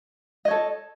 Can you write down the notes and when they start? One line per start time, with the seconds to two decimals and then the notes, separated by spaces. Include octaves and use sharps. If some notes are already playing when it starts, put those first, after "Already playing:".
0.45 D#5
0.48 C#5
0.51 A4